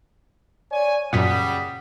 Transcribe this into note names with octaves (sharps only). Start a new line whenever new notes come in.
C#5 D5 G#5
F#2 A#2 C#3 G3 F#5 D#6 B6